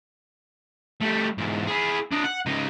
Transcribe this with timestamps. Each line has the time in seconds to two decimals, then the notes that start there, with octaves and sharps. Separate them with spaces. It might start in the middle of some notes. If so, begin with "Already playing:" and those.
1.02 G3 A3
1.38 E2 G#2
1.67 E4 G#4
2.12 D4 D#5
2.24 F#5
2.46 C#2 D#4